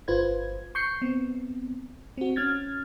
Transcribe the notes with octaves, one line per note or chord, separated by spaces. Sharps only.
G1 F4 B4 C5 G#6
C#6 G6 C7 C#7
B3 C4
C4 F#4
C#4 F6 G#6 A6